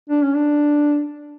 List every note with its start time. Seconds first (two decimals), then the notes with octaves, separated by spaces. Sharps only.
0.09 D4
0.23 C#4
0.35 D4